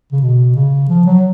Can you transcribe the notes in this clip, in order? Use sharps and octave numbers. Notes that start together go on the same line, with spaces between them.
C#3
B2
C#3
F3
F#3